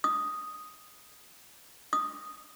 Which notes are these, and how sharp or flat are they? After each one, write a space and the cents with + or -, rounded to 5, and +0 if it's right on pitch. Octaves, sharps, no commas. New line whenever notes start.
D#6 +0
D#6 -5